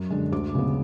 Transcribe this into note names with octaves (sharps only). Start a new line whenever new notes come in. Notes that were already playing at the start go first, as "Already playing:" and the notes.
Already playing: F#2
D3 G#3 D4
D2 D6
C#3 G#3 B3